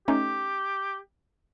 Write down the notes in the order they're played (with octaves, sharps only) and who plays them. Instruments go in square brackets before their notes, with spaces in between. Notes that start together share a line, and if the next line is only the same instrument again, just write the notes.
[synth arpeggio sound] A3 C#4 D#4 [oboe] G4